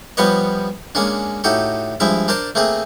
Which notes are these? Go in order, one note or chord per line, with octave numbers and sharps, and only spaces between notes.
F3 G3 B3 B4 C#5 D#5
G#3 A#3 C#4 D4
A2 D#4 F#4 G4 A4
G2 F3 G#3 E4 E5
D4 A#4 C5 A5
A3 A#3 C4 G#4